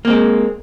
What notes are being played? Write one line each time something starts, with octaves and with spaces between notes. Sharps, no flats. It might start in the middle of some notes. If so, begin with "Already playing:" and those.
G#3 A#3 C4